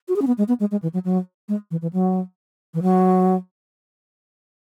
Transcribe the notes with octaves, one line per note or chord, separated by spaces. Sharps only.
F#4
G#4
C#4
B3
G#3
B3
G#3
G#3
E3
F#3
F#3
G#3
E3
E3
F#3
E3
F#3